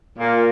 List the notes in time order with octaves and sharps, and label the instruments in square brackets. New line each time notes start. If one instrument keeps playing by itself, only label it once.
[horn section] A#2 A#3